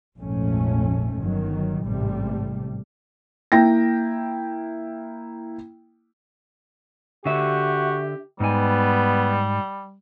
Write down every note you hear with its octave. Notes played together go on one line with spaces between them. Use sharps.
A#1 F2 G#2 A3 C#4
G1 D#3 F#3
A1 G#2 C3 G3 A3
A#3 E4 G5 A#6
D3 F#4 G4 E5
G#2 G3 B3 G#5